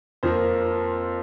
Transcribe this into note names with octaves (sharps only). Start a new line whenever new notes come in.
F2 F3 A#3 C5